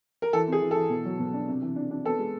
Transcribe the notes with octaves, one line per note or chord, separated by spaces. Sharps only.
A#4
E3 A4
C4 G#4
E3
A4
E3
B2
F#3
B2
D4
C3
E3
D4
D4
B3 A4
G#3